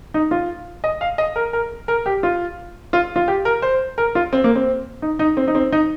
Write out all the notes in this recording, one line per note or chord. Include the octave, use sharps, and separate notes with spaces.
D#4
F4
D#5
F5
D#5
A#4
A#4
A#4
G4
F4
F4
F4
G4
A#4
C5
A#4
F4
C4
A#3
C4
D#4
D#4
C4
D#4
C4
D#4